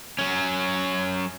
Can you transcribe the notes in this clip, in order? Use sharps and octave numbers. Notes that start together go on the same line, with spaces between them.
F#3 C#4